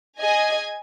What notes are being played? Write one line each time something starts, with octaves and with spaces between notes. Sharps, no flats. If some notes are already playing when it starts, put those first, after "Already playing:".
G#4 D#5 G#5